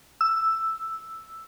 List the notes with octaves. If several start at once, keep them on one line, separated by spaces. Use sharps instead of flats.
E6